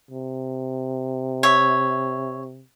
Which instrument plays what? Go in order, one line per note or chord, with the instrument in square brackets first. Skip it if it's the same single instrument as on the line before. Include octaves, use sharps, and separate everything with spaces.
[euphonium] C3
[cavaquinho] C#5 E5